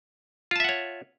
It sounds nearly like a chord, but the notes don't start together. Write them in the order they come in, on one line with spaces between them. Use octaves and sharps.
F4 A5 E5 F#5 C#5